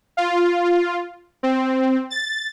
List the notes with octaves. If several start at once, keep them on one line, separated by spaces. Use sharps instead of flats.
F4
C4
A6